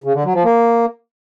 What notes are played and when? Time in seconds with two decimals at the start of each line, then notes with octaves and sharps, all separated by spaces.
0.04 C#3
0.14 D3
0.24 F#3
0.34 F3
0.44 A#3